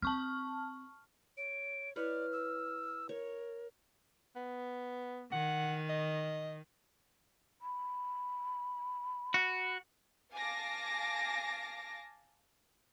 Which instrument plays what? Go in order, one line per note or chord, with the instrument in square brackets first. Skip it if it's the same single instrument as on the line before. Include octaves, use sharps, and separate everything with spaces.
[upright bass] C4 [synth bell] A5 C#6 F6
[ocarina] C#5 [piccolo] D7
[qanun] E4 B4 C#5 [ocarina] D5 [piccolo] F6
[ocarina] E6
[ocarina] A#4 [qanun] C#5
[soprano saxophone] B3
[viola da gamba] D#3 [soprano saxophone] F#5
[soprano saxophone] D#5
[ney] B5
[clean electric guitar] F#4
[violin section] F5 G#5 A5 D6 A#6